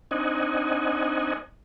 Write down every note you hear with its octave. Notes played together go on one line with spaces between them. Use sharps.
C4 D4 D#4 D#5 F#5 G#5